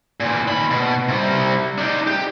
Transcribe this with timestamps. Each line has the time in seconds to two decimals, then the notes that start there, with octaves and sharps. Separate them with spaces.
0.20 A#2 E3
0.47 D#2 B5
0.71 B2
1.08 C3 G3
1.78 D4 D#4
2.07 G4